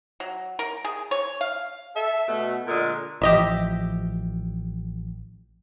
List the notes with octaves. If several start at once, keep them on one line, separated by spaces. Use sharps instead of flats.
F#3
A#4
G#4
C#5
F5
A4 E5
B2 A3
A#2 D3 G#3 A#4
A1 F3 G4 D#5 E5